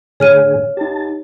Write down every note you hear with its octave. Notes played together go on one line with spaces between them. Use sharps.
A2 D3 G#4 C#5 F6 D#7
D#4 G4 A5